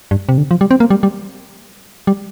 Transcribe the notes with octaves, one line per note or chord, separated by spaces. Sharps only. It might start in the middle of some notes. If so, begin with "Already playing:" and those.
G2
C3
D3
F3
G3
C4
A#3
G3
G3
G3